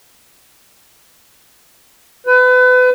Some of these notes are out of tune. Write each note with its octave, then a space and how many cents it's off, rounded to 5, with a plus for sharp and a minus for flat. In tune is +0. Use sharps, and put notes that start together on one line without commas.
B4 +30